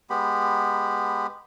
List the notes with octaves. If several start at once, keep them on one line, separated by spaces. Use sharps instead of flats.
G#3 B3 G4 B5